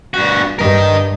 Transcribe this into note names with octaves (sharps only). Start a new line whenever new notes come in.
G2 F#4
G2 A#4 D#5